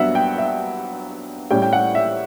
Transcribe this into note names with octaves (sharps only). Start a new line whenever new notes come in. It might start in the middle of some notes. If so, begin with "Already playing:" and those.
Already playing: G2 F#3 B3 E5 F#5
G5
E5
A2 G3 C#4 G5
G5
F#5
E5